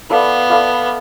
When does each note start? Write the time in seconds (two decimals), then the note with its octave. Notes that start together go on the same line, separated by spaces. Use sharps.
0.10 B3 E4 A4 D5 F5
0.50 E4 A4 D5 F5